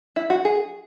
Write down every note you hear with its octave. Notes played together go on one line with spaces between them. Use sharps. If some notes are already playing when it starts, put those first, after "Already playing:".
E4
F#4
G#4